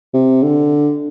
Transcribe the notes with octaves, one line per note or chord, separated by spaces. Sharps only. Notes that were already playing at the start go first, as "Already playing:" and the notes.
C3
D3